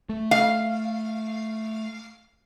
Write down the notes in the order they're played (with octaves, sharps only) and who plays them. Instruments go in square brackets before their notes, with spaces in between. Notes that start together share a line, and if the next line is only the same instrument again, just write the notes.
[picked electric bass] A3
[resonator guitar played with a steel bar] F5